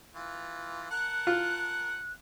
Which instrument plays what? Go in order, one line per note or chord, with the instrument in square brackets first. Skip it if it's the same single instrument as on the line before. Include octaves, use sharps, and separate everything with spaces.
[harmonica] E3 F4
[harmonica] A#4 F#5 A5 [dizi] F#6
[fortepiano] F4